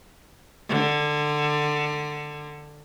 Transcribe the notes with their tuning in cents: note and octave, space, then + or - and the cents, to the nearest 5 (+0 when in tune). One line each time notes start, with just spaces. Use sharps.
D3 +15